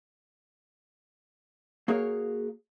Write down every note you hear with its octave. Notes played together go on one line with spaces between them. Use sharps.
A#3 F#4 G#4 A#4 C#5 F5